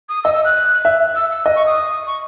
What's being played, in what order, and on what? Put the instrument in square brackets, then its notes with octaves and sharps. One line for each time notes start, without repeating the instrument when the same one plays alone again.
[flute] D#6
[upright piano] D#5 [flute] E6
[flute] E6
F#6
[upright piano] E5
[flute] E6
E6
[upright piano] D#5
[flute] C#6
D#6
C#6